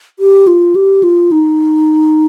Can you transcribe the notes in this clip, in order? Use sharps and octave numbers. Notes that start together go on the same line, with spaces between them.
G4
F4
G4
F4
D#4